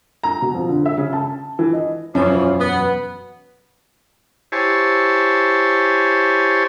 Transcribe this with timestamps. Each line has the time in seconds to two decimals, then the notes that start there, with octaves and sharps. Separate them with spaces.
0.23 A#5
0.42 B2
0.55 F2
0.69 D3
0.86 E5
0.98 C#3
1.13 A5
1.59 E3
1.73 D#5
2.15 E1 F#2 E3 F3 C#4
2.59 B3
4.52 E4 G4 C5 C#5 G#5 A5